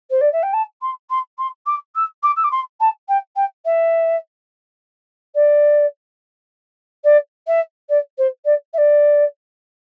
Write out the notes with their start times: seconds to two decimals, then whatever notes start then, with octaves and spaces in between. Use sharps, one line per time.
0.10 C5
0.21 D5
0.32 E5
0.42 G5
0.53 A5
0.81 C6
1.10 C6
1.38 C6
1.66 D6
1.95 E6
2.23 D6
2.36 E6
2.44 D6
2.51 C6
2.80 A5
3.08 G5
3.36 G5
3.65 E5
5.35 D5
7.04 D5
7.47 E5
7.89 D5
8.18 C5
8.45 D5
8.73 E5
8.78 D5